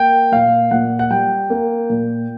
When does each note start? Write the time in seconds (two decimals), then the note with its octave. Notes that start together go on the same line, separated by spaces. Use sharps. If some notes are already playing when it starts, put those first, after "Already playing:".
Already playing: A#3 G5
0.32 A#2 F5
0.71 A#2 F#5
0.99 F#5
1.10 G3 G5
1.50 A#3
1.90 A#2